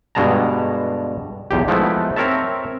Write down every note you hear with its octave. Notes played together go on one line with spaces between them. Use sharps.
G2 B2 D3 G#3 A5 A#5
B1 E2 G4
F3 G#3 A3 B3 D#4 E4
C4 A#4 C#5 E5 A5